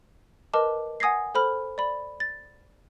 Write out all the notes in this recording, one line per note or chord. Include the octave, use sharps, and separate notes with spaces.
A#4 B4 D#5 A5 D6
F#5 G#5 D#6 G#6 A#6 C7
A4 C5 B5 F6
D5 B5
A6